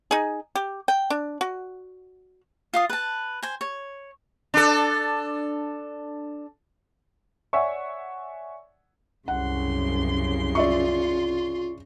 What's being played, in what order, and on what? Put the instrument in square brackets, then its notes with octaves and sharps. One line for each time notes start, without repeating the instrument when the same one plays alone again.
[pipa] D#4 G#4
G4
G5
D4
F#4
[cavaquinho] F4 F5 D#6
B4 A5
C5 G#5
C#5
[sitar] D4 A4
[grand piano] C#5 D5 E5 F#5 G#5 C#6
[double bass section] C2 F#2 [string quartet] C#3 C6 [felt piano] F#5
[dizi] F4 [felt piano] D5 E5 C#6